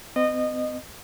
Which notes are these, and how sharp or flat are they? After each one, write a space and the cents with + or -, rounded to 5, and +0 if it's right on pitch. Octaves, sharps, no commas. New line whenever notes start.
C4 -45 D#5 -20